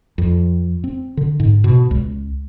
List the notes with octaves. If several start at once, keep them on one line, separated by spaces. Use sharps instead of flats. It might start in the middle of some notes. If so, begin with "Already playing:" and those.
F2
C4
D3
G#2
B2
C#2